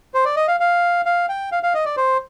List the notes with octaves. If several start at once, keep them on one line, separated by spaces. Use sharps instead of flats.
C5
D5
D#5
F5
F5
F5
G5
F5
F5
D#5
D5
C5